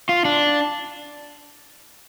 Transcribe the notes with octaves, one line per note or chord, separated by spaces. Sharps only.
F4
D4